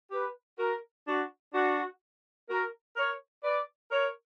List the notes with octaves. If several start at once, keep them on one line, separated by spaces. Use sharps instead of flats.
G4 B4
F#4 A#4
D4 F#4
D4 F#4
F#4 A#4
A#4 C#5
B4 D5
A#4 C#5